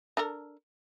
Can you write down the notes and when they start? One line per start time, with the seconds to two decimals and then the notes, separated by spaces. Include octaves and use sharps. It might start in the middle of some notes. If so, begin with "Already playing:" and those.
0.17 D4 A4 A#4